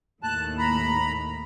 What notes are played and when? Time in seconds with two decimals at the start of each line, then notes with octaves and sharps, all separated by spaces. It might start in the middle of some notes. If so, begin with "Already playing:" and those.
0.23 D#2 A2 A5 F#6
0.58 A#5 B5